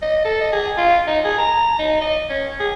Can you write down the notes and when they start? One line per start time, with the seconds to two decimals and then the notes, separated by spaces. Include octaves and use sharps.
0.02 D#5
0.25 A4
0.41 D#5
0.52 G#4
0.77 F4
1.07 D#4
1.24 G#4
1.38 A#5
1.79 D#4
2.01 D#5
2.29 C#4
2.60 G#4